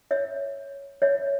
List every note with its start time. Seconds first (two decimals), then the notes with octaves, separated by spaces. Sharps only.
0.11 C#5 E5
1.02 C#5 E5